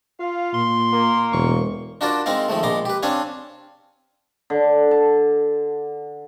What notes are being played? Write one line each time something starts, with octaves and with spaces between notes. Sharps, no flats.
F4 F5
A#2 C6
A#3
E1 C#6
D4 F4 F#4 A#4 C5 D5
G#3 C4 D#4 A#4 F5
D#3 F3 G#3 A3
A#1 A#2 G#3 A#5 C6 D6
G4 B4
C4 D4 C#5 F5 G#5
D3
A5